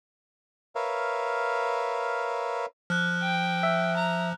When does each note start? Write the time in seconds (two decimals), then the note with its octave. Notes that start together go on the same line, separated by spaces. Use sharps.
0.75 A#4 B4 C#5 E5 F5
2.90 F3 F6 F#6
3.22 G5
3.63 E5
3.96 A#5